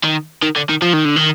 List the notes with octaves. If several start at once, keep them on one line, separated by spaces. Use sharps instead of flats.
D#3
D#3
D3
D#3
F3
D#3
D3
D#3